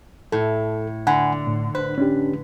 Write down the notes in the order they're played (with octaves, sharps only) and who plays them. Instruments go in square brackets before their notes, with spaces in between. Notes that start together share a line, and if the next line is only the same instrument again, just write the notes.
[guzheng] A2 [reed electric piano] A4
[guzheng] D3 [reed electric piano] F#5 G#5 B5
[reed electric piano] A2
[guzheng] B4 [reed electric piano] C5
[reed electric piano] C#4 D4 G4